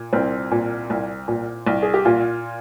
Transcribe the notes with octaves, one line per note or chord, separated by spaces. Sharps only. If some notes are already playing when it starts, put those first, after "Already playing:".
Already playing: A#2
C2 C4
A#2
C2
A#2
C2
G#4
G4
A#2 F4